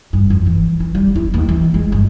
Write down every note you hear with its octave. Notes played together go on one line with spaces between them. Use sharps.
G2
F2
E3
E3
G3
E4
D#2
E3
G#3
G1